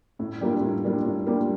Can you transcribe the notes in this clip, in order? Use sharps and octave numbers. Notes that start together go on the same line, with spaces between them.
A2
G3 A#3 D4 F4
A2
G3 A#3 D4 F4
A2
G3 A#3 D4 F4